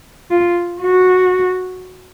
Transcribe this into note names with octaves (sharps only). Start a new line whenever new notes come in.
F4
F#4